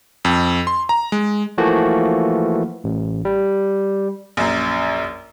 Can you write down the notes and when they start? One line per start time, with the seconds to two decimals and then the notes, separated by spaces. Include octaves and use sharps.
0.25 F2
0.67 C6
0.89 A#5
1.12 G#3
1.58 E3 F3 A3 A#3 F#4
2.84 A1
3.25 G3
4.37 A#1 F#2